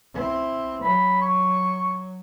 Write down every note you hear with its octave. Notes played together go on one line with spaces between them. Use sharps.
C4 E4
F#3 B5
C#6